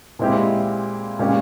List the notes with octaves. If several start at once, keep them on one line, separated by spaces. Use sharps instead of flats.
A#2 G#3 C4 E4 G4
A#2 G#3 C#4 G4